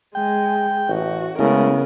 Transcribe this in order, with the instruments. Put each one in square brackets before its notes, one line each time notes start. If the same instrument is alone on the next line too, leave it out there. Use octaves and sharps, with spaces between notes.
[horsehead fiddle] G#3 [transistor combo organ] G5
[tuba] A1 [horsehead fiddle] F#4
[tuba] C#3 [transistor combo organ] G#3 A3 E4 [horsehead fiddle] B3 A#4